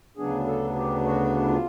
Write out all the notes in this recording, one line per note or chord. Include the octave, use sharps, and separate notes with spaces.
D2 C#3 F#3 B3 D4 G#4
A4
G4
F#4
E4
F4